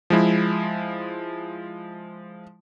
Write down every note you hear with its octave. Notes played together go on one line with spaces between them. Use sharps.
F3 G#3 E4